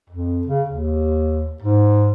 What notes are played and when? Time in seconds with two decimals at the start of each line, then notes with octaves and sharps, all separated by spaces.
0.09 F2
0.47 C#3
0.69 D#2
1.62 G#2